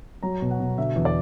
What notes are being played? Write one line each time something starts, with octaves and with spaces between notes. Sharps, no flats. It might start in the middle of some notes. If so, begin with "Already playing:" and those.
F#3 A#5
B2
F#5
B2
D3 E5
E2
D5